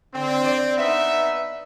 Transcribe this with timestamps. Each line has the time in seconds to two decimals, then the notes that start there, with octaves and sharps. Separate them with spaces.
0.15 D3 C4
0.44 D5
0.78 B3 D#4 E5